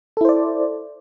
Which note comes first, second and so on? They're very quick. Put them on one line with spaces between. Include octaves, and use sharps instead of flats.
A4 E4 C5 D5